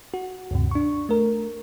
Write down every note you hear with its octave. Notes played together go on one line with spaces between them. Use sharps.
F#4
D2 G2 C3
D4 C#6
A3 A#4